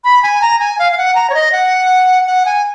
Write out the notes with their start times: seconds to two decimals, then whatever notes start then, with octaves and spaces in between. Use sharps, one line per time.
0.04 B5
0.23 G#5
0.42 A#5
0.60 G#5
0.79 F5
0.92 F5
0.98 F#5
1.15 A#5
1.30 C#5
1.35 D#5
1.52 F#5
2.27 F#5
2.46 G#5